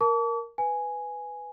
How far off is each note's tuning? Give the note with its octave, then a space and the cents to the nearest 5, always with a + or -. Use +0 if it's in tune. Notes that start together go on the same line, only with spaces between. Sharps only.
A#4 +0 A5 +0 D6 -45
B4 +10 G#5 +0